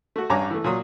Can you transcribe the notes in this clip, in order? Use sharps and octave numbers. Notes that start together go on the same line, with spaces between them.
A3 F#4
A1 G2 C#5 G#5 A#5 D6
E3 A3
A#2 F#3 D#6